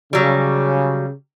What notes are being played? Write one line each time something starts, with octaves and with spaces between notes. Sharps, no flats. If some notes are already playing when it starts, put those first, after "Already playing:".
C#3 F#3 G3